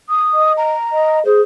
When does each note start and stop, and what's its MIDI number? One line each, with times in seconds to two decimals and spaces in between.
0.09 0.52 87
0.33 0.72 75
0.57 1.19 82
0.92 1.23 75
1.25 1.41 68
1.25 1.43 72